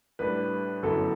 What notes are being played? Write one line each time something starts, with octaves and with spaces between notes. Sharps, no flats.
A2 G3 D4 B4
G1 F#2 F#3 B3 E4 A4